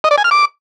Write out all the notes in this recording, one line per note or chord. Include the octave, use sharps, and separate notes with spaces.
D#5
D5
G#5
F6
D6